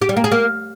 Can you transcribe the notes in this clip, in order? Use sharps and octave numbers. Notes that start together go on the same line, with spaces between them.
G4
G3
A#3
G#4
A#3